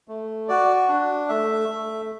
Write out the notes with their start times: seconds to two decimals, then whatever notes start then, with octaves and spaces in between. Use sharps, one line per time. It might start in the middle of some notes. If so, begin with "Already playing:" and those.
0.08 A3
0.48 F#4 D5
0.89 D4
1.29 A3 E5
1.69 A3